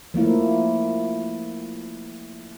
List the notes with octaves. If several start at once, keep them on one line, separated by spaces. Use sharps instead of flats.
F3 A3 A#3 E4